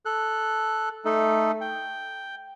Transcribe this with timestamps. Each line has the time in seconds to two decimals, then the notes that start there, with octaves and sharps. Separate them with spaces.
0.05 A4 F#6
1.05 A3 D#4 A4
1.61 G5